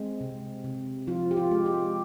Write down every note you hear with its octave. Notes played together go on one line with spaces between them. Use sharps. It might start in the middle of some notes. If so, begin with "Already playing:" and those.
Already playing: G#3 C4
C3
C3
F3 F4
G4
F4
G#3
G4